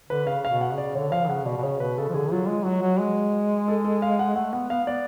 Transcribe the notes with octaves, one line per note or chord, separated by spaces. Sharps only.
D3 B4
C#3 F5
B2 F5
F#5
C#3
D5
D3 C#5
F3 F5
C#3 F#5
B2 D5
B2
C#3 C#5
B2 B4
C#3 A4
F3
D3 G#4
F#3 F4
G#3
F#3 F#4
F#3
G#3
A4
A4
F5
F#5
A3 F#5
B3 F#5
B3 F5
B3 D5